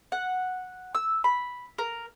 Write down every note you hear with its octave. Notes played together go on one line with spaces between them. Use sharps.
F#5
E6
B5
A#4